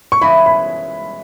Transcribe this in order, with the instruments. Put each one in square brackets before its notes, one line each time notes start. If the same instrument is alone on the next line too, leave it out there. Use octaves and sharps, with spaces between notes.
[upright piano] C#6
[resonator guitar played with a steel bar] C#3 E3 G#3 C#4 E4 [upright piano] B5
[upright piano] B5